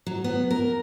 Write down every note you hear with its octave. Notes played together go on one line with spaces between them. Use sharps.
F#3
B3
A#4